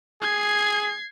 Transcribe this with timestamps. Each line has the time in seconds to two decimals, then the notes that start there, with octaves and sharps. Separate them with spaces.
0.22 G#4 G#6 C7